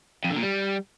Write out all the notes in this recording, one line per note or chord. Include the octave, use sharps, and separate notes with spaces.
F2
D3
A#2
G3